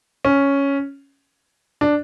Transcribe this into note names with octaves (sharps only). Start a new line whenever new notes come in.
C#4
D4